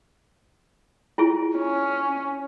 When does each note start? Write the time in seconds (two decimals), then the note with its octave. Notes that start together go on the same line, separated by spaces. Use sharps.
1.18 E4 F4 G#4
1.57 C#4